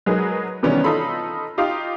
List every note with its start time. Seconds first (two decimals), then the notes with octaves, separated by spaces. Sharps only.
0.06 F#3 G#3 D#4 G#4 A#4 B4
0.63 C3 D#3 E3 G3 B3 C#4
0.84 D#4 F4 A4 B5 C6
1.58 D#4 F4 G4 F5